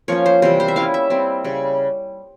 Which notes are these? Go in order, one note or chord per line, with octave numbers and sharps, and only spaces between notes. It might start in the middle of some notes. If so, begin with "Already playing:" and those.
F3 A#3 C#4 C#5
C5
C3 E3 G3 C5
C5
E5
G3 C#4 E4 F5
E5
G3 C4 E4
C#3 G3